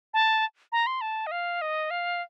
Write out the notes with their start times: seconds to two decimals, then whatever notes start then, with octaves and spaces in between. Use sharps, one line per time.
0.14 A5
0.72 A#5
0.87 C6
1.01 A5
1.27 D#5
1.31 F5
1.62 D#5
1.91 F5